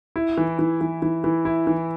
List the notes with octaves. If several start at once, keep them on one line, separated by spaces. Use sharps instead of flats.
E4
E3
E3
E3
E3
E3
E4
E3